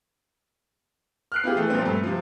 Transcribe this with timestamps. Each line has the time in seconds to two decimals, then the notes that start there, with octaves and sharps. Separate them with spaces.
1.32 F6 F#6 C7
1.43 B3 E4 F4 G4 G#4
1.56 E3 A3
1.70 A#2 F3 B3 C4
1.82 G2 A3
2.03 C3 F3